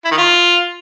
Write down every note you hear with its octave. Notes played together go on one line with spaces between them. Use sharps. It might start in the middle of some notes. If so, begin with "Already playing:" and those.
E4
D#3
F4